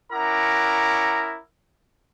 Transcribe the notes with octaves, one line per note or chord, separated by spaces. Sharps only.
C#4 E4 A#4 F#5 A#5 D6